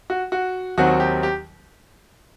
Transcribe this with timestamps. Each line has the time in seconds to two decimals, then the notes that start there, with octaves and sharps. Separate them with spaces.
0.10 F#4
0.32 F#4
0.77 D#2 D#3 F#3 C4 F#4
1.00 G4
1.23 G4